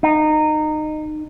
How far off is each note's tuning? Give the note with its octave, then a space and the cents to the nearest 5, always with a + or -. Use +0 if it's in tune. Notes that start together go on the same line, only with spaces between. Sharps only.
D#4 -20